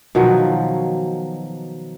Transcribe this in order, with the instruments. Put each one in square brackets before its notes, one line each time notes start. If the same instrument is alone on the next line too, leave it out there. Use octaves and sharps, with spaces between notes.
[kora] B2 D#3 F3 F#3